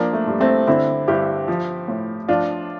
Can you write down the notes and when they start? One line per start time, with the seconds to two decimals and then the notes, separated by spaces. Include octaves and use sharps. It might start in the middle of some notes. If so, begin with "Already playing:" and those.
Already playing: F3 A#3 D4
0.13 A3
0.27 G2
0.40 A3 C4
0.67 D3 C4 E4
1.08 G2 E4 G4
1.48 F3
1.88 A2
2.28 F3 D4 F4